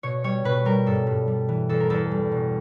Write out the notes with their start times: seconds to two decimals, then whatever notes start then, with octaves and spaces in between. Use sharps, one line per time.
0.03 B2 C#5
0.24 G3 C#5
0.44 B2 B4
0.65 G3 A#4
0.86 G2 A4
1.07 G2
1.28 G3
1.49 E3
1.69 E2 A4
1.80 A#4
1.90 E2 A4
2.11 G3
2.32 B2